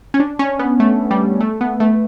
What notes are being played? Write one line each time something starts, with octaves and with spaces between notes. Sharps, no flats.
C#4
D4
C#4
B3
A3
G3
A3
B3
A3